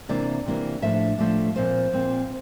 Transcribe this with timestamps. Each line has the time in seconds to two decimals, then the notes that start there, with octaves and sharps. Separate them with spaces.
0.09 C3 E3 A#3 D4 D5
0.46 C3 E3 A#3 D4
0.82 A2 F3 A3 D4 E5
1.19 A2 F3 A3 D4
1.56 A#2 F3 C4 C5
1.92 A#2 F3 C4